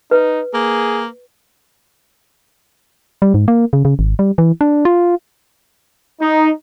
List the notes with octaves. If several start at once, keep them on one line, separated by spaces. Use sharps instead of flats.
D#4 B4
A#3 G#4
G3
G#2
A#3
C#3
C#3
G#1
G3
E3
D4
F4
D#4